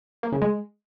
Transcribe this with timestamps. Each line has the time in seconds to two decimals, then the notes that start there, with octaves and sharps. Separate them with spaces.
0.23 A#3
0.32 C#3
0.42 G#3